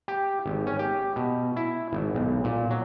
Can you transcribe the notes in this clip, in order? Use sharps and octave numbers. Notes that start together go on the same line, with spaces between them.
G4
G#1
C#4
G4
B2
E4
G#1
B1
A#2
F#3